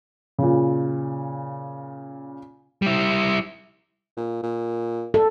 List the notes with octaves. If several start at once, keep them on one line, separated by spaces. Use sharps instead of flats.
A#2 C#3
G3 E4
A#2
A#2
A4